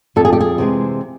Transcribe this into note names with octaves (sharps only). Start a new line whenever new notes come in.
F2 A4
G#4
G4
G#4
C3 E3 G#3 C4